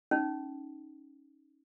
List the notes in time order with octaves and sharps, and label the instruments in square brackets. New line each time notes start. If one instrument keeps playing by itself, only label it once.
[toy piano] C#4 D#4